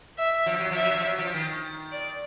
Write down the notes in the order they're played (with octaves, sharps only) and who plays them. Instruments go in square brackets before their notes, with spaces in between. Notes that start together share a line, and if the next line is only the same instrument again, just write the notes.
[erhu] E5
[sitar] F3
F#3
[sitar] F3 [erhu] E5
[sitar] F#3
F3
F#3
F3
D#3
[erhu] D5